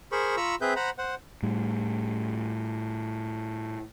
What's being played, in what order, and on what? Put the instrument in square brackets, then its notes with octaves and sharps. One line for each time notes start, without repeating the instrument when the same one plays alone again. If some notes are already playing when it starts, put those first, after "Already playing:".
[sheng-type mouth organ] G#4 A#4 C5 B5 C#6
F4 A#5 B5 C#6 E6
C4 G#4 B4 E5 G6
C5 F#5 A#5 B5
C5 F#5
[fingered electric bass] A2 G3